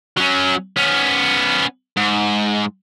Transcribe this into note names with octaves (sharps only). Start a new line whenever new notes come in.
F#3 C#4
B3 C#4
G#2